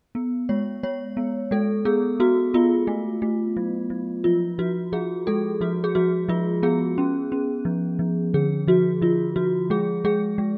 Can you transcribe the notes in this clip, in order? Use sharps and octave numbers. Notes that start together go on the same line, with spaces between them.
B3
G#3 C#5
G#3 C#5
B3
G#3 A4
B3 G#4
B3 F#4
B3 F4
A3
A3
F#3
F#3
F3 F4
F3 F#4
F3 G#4
G#3 A4
F3 F#4
G#4
F3 F#4
F3 F4
B3 G#4
C#4
C#4
F3
F3
D3 G#4
F3 F#4
F3 F4
F3 F#4
G#3 G#4
G#3 G#4
G#3